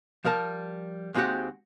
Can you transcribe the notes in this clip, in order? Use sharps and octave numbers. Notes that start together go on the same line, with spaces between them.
F3 G3 A#4 A5
D#2 G#3 C4 F#4 G4 F#5